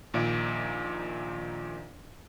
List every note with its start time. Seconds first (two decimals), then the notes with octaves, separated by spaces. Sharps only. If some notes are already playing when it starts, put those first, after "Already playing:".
0.14 A#1 A#2 D#3 D5 E5 D7